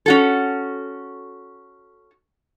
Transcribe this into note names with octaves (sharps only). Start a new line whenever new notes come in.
C#4 F#4 A4